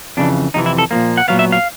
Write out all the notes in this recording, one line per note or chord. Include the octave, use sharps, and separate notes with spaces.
F2 C#3 E3 D4
F2 C3 E3 D#4
E4
A4
A#2 F3 A#3
F#5
A#2 F#3 B3 F5
E5
F5